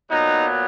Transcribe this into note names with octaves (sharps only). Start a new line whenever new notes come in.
A#2 F#3 B3 D#4